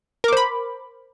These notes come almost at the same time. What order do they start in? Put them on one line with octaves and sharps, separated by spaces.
A#4 D6 C5 B5